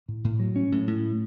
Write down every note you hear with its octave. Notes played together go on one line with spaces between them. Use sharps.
A2
A2
F#3
C#4
A2
A2